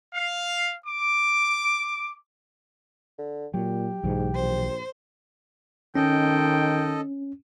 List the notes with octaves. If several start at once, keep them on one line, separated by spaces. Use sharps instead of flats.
F5
D6
D3
A#2 F#3 G4
B1 G#2 E3 F#3
A#1 C5
D#3 C#4 A4 D#5 G5